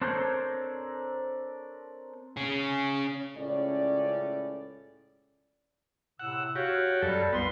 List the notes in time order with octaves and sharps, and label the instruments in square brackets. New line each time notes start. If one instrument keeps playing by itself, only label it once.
[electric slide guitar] C4 D4 A4 A#4 C5 C#5
[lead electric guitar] C#4 G#4
[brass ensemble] C#2 A2 C#4 D5
[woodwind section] A2 C3 E6 [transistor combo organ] F#5
[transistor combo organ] F#4 G4 [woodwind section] C#5 F5
[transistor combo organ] F#2 A4 [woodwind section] G3
[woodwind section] C2 C6 [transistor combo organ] B3